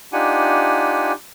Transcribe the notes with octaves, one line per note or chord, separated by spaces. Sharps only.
D4 D#4 F4 G4 F#5 G#5